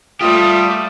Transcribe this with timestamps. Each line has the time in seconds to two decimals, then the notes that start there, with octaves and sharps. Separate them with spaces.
0.21 A3 F4 G4 D5 D#6